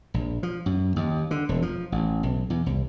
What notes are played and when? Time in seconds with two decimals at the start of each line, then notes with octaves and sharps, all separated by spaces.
0.14 A#1
0.43 F3
0.66 F#2
0.96 D#2
1.31 D3
1.49 E1
1.62 F3
1.92 A1
2.23 B1
2.50 E2
2.66 C2